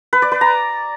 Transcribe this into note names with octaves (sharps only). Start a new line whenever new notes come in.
B4
D5
B4
A#5